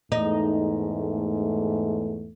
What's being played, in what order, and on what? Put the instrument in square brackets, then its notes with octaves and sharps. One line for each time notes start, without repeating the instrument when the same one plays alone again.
[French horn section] E2 G#2 A3 [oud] D#4